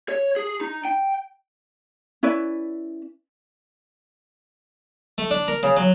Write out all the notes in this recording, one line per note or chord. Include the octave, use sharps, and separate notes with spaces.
C#5
G#4
D#4
G5
C#4 E4 B4 D5
A3
D4
A#4
C#3
F#3